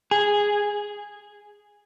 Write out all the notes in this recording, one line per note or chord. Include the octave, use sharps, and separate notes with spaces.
G#4